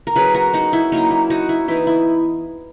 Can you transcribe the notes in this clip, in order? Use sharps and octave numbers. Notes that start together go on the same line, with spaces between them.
A#4
F#3 C#4 G#4 B4
F#4 A#4
D#4 F#4
E4
F#3 A#3 C#4 D#4
E4
D#4 F#4
E4
E3 B3 D#4 E4
E4